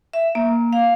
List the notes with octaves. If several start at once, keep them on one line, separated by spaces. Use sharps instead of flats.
E5
A#3
F5